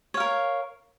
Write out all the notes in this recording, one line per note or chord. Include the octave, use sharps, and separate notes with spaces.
A#4 C#5 F5